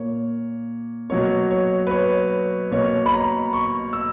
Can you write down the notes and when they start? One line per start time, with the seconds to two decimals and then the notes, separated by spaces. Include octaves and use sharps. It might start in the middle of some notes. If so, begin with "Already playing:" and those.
Already playing: A#2 A#3 C#5
1.10 B2 F#3 A#3 C#5
1.50 C#5
1.87 B4
1.91 C#5
2.71 B2 A#3 C#5
3.06 B5
3.12 A#5
3.53 C#6
3.93 E6